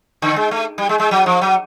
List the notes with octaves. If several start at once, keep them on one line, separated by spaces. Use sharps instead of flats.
D3
G#3
A3
G3
G#3
G#3
F#3
F3
F#3